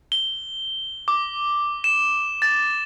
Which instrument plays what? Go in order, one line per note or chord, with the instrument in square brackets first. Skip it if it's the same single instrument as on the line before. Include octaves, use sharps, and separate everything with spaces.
[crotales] G7
D6
E7
A6